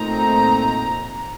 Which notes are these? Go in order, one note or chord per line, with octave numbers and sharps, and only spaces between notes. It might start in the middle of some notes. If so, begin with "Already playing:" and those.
Already playing: A#2 A3 C4 D#4 A#5